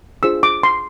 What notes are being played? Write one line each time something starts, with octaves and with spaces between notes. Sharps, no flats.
D4 F4 G#4 C5 E6
D6
C6